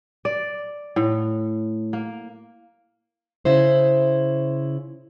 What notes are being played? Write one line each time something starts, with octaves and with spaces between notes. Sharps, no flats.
D5
A2
A#3
C#3 E4 C5